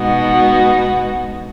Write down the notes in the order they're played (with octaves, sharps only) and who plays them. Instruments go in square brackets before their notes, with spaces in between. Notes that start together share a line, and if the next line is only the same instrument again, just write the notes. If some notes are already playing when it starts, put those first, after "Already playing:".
Already playing: [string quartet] B2 G#3 B3 D#4 F#4